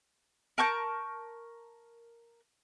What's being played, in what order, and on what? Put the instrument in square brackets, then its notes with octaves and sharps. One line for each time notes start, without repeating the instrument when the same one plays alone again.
[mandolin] A#4 A5 C#6 G6